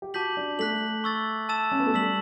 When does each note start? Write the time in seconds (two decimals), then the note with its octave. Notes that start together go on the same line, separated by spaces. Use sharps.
0.02 G4
0.14 F#4 A5 D6 G6 B6 F#7
0.37 D4
0.59 A3 F#6 B6 F#7
1.04 C#6 E6 A6
1.49 A5 E6 A6 E7
1.72 C#4
1.80 B3
1.87 A3
1.94 G3 E6 B6 F#7